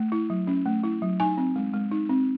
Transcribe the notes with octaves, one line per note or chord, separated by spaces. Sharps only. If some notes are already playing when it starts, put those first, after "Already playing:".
Already playing: A3
E4
F#3
C#4
A3
E4
F#3
D#4 G#5
C4
G#3
G#3
D#4
C4